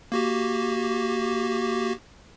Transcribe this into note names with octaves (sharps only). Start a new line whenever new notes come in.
A#3 F#4 G4